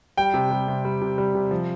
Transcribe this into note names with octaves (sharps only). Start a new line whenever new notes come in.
G3 G5
C3
G3
C3
G3
C3
G3
C3
F3